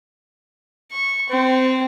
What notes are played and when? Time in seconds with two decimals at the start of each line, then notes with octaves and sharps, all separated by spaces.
0.92 C#6
1.29 C4